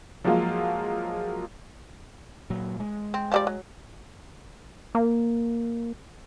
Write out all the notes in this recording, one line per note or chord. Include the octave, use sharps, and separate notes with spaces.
F3 F#3 G#3 A#3 F4
A#2 F#3
G#3
C4
F3 G3 D5
F#3
A#3